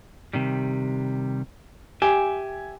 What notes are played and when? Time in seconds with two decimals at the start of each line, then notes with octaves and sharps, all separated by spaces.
0.33 C3 D#3 G3
2.02 G4 E5 G#5